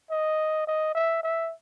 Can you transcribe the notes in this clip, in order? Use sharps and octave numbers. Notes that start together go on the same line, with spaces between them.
D#5
D#5
E5
E5